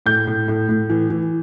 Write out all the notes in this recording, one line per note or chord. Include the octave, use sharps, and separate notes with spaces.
A2 G6
A2
A2
A2
E3
E3